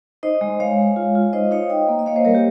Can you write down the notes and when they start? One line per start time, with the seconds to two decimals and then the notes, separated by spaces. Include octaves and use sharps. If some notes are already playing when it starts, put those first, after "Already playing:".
0.23 D#4 C5 D#5
0.41 G#3
0.60 G#3 C#5 F5
0.79 G#3
0.96 F4
1.15 F4
1.33 D#4 C5 D#5
1.51 D#4 C#5 F5
1.70 D#4 D#5 G5
1.88 A#3
1.99 D#5
2.06 A#3 C#5 F5
2.16 C5 D#5
2.25 G3 A#4 C#5
2.35 G4